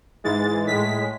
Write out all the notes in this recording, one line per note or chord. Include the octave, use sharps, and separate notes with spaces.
G#2 E3 G#3 A6
A2 G#3 B6